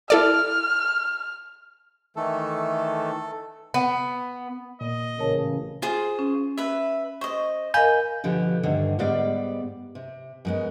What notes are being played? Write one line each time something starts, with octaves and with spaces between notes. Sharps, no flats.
E4 A4 D5 F6
D#3 E3 A3 A4
B3
A#2 D#5
A1 C#3 A#4 C#5 A5
F4 G#4 C5
C#4
B4 E5
C5 D#5 C#6
A#4 D#5 F5 G#5 B5 G6
B2 D3 F3 G4
D2 G2 D3 D#3
G#2 G3 G#3 B3 D5 F5
C3
F#2 G#3 B3